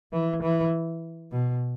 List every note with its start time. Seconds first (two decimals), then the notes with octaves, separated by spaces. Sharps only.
0.12 E3
0.42 E3
1.32 B2